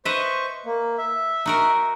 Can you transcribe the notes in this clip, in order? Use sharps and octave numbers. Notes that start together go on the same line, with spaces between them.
B4 C5 D#5 E5 C#6
A#3
E5
D#4 F#4 A#4